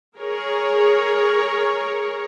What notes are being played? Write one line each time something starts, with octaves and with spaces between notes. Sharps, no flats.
G#4 A#4 C#5